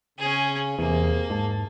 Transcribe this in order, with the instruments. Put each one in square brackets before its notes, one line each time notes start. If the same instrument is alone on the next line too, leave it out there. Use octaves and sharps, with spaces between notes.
[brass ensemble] C#3 [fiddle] C#4 G#4
[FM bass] E2 [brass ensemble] C3 G#4 [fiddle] A#3
[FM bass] G#2 [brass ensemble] A5